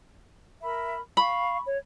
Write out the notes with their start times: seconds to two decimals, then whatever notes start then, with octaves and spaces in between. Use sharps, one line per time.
0.62 A#4 E5 B5
1.17 F5 B5 C#6
1.67 C#5